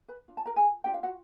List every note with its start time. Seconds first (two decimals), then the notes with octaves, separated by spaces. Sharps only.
0.08 B4 B5
0.28 D4 F4
0.37 A5
0.46 A#4 A#5
0.56 G#4 G#5
0.84 D4 F4 G4 G5
0.94 F5
1.03 F#4 F#5